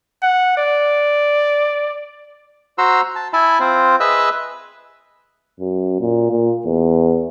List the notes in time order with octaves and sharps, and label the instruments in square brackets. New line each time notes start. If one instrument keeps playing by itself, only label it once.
[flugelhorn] F#5
D5
[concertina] F#4 C5 A#5 C6 E6
A5
E4 E5 G#5 A5 B5
C4 F4 C5
G#4 B4 D#5 E5 E6 F#6
[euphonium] F#2
A#2
A#2
E2